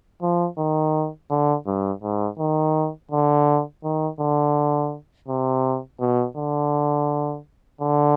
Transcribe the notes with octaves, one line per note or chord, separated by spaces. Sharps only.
F3
D#3
D3
G2
G#2
D#3
D3
D#3
D3
C3
B2
D3
D3